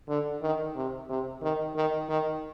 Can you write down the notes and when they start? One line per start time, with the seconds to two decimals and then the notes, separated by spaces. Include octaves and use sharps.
0.08 D3
0.42 D#3
0.76 C3
1.09 C3
1.42 D#3
1.76 D#3
2.09 D#3